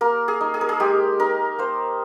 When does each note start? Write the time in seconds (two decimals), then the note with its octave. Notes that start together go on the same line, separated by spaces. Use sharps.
0.01 A#3 A#4
0.28 G#4
0.41 D#4
0.54 G#4
0.61 A#4
0.69 G#4
0.80 G#3 G4
1.20 D#4 A#4
1.59 A#3 C5